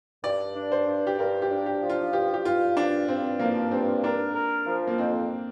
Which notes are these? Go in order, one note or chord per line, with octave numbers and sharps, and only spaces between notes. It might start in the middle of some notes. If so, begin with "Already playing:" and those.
G2 D5
D4
C5
G2
G4
G2 A#4
G4
D4
G4
F3
F4
G2 G4
G4
G2 F4
F3 D4
G2 C4
F3 A#3
G2 C4
D4 A#4
A#4
F3
A#3
F2 C4